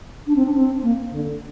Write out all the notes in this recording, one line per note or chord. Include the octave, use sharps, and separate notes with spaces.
D4
C4
D4
C4
A#3
D3